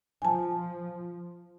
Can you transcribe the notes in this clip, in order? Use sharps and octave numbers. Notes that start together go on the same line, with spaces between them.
F3 G#5 A5